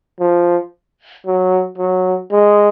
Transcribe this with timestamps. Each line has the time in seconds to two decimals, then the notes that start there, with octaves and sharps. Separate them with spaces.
0.20 F3
1.26 F#3
1.78 F#3
2.32 G#3